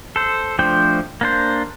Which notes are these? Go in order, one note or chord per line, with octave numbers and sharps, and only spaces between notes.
A4 C5
F3 A3 D4 C5 G5
A#3 D4 C5